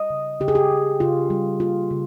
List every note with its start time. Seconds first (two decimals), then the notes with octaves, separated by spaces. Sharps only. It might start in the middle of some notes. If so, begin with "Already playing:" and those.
Already playing: G3 D#5
0.10 C#3
0.40 C#3 G4
0.48 G#4
0.55 G4
0.71 C#3
1.00 C#3 F4
1.30 G3
1.60 A#3 F4
1.91 C#3